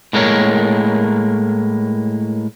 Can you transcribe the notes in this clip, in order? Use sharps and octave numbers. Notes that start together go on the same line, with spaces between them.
A2 G#3 A#3 A#4 C#5